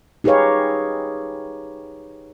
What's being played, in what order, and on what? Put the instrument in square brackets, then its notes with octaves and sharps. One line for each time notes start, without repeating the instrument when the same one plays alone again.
[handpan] D#4 G4 G#4 B4 C#5 F5